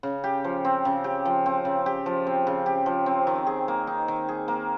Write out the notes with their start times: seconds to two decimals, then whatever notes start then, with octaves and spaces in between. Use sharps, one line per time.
0.03 C#3
0.24 G4
0.44 F3
0.65 C4
0.85 C#3
1.04 G4
1.25 F3
1.46 C4
1.65 C#3
1.86 G4
2.06 F3
2.27 C4
2.47 C#3
2.66 G4
2.86 F3
3.06 C4
3.27 D#3
3.47 G#4
3.68 A#3
3.87 D#4
4.08 D#3
4.29 G#4
4.48 A#3